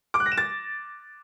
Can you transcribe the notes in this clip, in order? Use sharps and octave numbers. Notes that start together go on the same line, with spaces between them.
D6
F#6
A#6
E7
A6